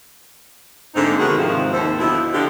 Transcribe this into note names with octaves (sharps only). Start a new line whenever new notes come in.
G#2 D3 A3 A#3 C4 D#4
C3 D#3 B3 F#4 G#4 A#4
G#2 C3 D#3 F3
D#2 A4 C5
B2 D3 F3 E4
D3 F3 G4